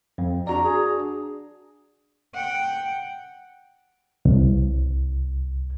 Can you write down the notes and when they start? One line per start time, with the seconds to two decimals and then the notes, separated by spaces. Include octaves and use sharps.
0.18 F2
0.47 D4 F#4 D5 A#5
0.63 G#4
2.34 F#5 G5
4.25 C2